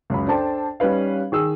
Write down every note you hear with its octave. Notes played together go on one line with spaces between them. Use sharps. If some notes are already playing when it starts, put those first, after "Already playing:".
C#2 F#2 B5
D4 A4 C5 G5 A5
G3 C#4 D#4 B4 F5
D#3 G#4 E6